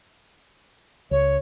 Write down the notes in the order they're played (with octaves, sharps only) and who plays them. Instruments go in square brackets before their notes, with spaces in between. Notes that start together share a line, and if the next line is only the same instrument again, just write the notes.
[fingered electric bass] C#2 [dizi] C#5